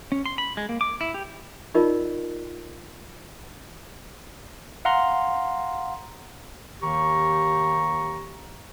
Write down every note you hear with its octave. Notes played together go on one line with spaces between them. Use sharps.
C#4
C6
B5
G#3
A#3
D6
E4
G4
D#4 F4 A#4 D5 D#5
F5 F#5 A#5 C6
D#2 D#3 G4 A#5 C#6